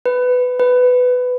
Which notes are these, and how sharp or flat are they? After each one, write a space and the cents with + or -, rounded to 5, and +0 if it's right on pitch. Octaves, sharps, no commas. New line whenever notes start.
B4 +10
B4 +10